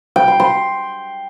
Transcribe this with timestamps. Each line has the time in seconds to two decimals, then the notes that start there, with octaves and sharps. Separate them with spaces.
0.16 G5
0.28 C6
0.40 C6